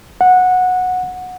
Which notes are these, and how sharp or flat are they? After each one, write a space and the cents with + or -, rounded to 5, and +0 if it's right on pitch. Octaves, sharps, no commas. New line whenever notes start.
F#5 -15